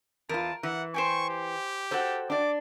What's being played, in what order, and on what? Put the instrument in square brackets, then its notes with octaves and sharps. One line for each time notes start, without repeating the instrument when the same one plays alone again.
[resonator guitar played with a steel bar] E2 F4 [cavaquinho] A#4 [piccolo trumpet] A5
[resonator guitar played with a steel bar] E3 [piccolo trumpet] F#5
[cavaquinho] C5 G5 G#5 [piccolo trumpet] C#6
[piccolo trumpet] G4
[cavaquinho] F#4 G5 [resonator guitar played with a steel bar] A4 C5
[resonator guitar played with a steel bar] D4 D5 [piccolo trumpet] D6